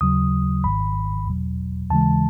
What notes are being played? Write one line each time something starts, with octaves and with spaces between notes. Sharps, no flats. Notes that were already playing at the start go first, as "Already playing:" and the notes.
D#2 C#3 F#3 D#6
G#1 G#2 D#3 B5
E2 B2 F#3
D#2 C#3 E3 G#3 A5